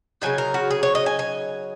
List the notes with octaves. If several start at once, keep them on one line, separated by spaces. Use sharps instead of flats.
C#3 F#3 D#4 G#5
A#4
F#4
G#4
C#5
D#5
G#5
G#5